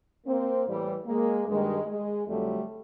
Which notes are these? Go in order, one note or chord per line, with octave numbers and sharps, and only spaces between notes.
A#3 C4
A2 E3 G3
G#3 A#3
G2 D#3 G3 G#3
G#3
F2 D3 F#3 G3 A3